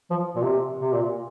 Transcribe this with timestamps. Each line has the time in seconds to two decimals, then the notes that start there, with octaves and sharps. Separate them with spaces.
0.10 F3
0.35 A#2
0.43 C3
0.81 C3
0.92 A#2